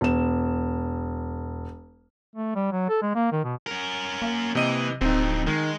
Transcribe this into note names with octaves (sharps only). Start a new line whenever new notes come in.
E1 E7
A3
G3
F#3
A4
G#3
A#3
D#3
B2
C#4 A#4
A#3
C3 E3 D#5 D#7
D1 F2 C4 D#4
D#3 G#3